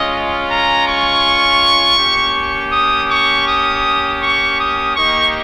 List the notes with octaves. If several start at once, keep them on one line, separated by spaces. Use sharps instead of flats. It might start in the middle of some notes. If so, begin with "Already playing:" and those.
Already playing: G#3 C#4 F4 D#5
A#5
C#6
A#3 C#4 G4
D#6
C#6
D#6
C#6
D#6
A#3 D#4 G4 C#6